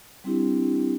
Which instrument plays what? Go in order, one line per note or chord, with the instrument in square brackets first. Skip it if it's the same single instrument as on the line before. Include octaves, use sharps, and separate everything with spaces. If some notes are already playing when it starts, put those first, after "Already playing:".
[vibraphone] G3 C4 D4 E4 G4